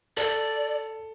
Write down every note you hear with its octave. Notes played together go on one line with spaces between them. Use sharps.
A4 D5